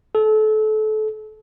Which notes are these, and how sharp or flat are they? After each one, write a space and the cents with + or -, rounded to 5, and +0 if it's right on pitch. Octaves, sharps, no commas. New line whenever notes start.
A4 -30